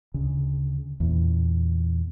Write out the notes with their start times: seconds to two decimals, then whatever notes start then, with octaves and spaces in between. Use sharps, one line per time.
0.14 D2 C#3
1.00 E2 A#2